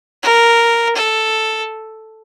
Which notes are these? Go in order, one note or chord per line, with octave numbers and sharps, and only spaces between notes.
A#4
A4